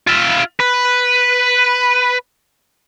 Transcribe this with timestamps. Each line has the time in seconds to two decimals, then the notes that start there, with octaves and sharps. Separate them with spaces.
0.07 F4 E5
0.60 B4